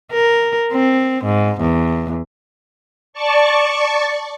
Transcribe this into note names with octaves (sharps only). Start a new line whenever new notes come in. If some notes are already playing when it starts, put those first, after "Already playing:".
A#4
C4
G#2
E2
D5 A5 C#6